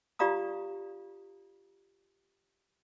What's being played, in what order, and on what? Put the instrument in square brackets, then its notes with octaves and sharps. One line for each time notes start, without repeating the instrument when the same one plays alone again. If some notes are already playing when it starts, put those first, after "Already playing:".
[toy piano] F4 G4 D5 F5 A#5 D#6